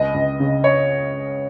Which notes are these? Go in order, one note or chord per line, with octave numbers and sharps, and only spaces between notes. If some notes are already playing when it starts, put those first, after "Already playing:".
Already playing: C#2 D#5
C#2
C#3
C#5